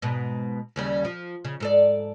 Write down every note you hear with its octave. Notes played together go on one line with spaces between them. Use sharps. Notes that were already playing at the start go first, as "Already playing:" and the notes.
G#2 B2
D#2 C#3 G3
F3
C#3
G#2 A4 D5